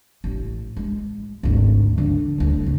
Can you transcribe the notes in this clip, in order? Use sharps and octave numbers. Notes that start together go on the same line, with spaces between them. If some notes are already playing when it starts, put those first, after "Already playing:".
A1
G#3
G#1 D2
D3 D#3
D2 F#3
G#2 C#3